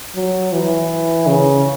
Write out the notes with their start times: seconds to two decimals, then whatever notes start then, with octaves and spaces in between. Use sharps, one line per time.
0.15 F#3
0.53 E3
1.27 C#3